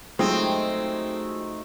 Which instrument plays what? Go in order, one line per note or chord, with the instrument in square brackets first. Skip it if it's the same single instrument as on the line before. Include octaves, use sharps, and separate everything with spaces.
[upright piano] F#3 G#3 F4 [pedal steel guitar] A3 D#4 D#5 [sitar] C4